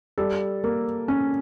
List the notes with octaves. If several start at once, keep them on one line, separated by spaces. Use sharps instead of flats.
G3 A4
A#3
C#4